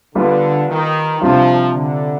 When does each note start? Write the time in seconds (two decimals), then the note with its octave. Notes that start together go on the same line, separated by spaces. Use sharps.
0.15 D3 G3 B3 F4 B4
0.68 D#3
1.21 C3 F3 G3 D4 F4
1.74 D3